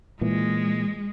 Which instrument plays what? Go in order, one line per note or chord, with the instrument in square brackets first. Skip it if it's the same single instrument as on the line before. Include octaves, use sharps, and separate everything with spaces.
[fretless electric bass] A#2 E3 [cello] G#3